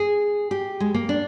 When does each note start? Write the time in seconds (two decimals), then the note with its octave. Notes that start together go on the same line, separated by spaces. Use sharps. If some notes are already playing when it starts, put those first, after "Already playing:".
Already playing: G#4
0.51 G4
0.80 G#3
0.94 A#3
1.09 D4